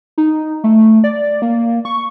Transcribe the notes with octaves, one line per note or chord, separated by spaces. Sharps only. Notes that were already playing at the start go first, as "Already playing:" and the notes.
D#4
A3
D5
A#3
C#6